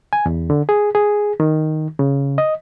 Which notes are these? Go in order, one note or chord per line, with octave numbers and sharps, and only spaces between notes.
G#5
E2
D3
G#4
G#4
D#3
C#3
D#5